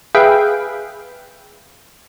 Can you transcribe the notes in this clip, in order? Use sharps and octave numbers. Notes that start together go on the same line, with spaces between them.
G#4 B4 E5 F5 G5